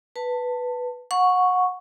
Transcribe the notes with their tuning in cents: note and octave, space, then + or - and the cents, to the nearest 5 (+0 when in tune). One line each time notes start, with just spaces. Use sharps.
B4 +0 A5 +20
F#5 -25 C#6 +0